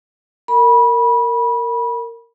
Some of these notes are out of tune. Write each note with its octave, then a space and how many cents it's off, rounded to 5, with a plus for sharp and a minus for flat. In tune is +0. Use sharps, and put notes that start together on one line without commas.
A#4 -20 B5 -25